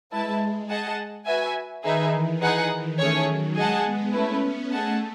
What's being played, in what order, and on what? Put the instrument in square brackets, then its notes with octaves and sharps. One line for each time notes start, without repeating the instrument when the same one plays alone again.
[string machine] G#3 [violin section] E4 B4 E5 A5
[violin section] G#4 D#5 F#5 A5
F#4 B4 E5 G#5
[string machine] D#3 [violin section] D#4 G#4 B4 E5
[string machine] E3
[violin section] D#4 G#4 B4 F#5
[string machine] D#3
[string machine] D#3 [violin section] A3 C#4 G#4 C#5
[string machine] F#3
[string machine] G#3 [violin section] G#4 D#5 F#5 A5
[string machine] B3
[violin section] A3 E4 B4 [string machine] C#4
[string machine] B3
[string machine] A3 [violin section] G#4 D#5 F#5 A5